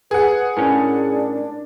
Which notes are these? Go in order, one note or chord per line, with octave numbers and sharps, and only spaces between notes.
G#4 B4 F#5
A2 C#4 D4 A#4